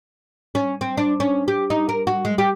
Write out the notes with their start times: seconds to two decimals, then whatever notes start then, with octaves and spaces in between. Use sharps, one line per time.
0.55 C#4
0.81 C4
0.97 D4
1.20 C#4
1.48 G4
1.70 D#4
1.89 A#4
2.07 F#4
2.25 G#3
2.38 G4